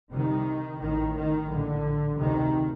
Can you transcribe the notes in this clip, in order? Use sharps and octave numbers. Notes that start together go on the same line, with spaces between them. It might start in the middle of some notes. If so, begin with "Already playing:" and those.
C2 C3 D#3
A1 A2 D#3
D#3
A#1 A2 D3
D2 C3 D#3